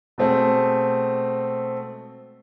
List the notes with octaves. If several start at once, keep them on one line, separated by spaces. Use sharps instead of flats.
B2 G#3 A3 C4